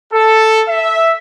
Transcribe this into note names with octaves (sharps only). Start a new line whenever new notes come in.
A4
E5